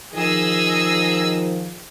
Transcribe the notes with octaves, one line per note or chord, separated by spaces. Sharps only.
D#3 F3 G#4 D#5 E6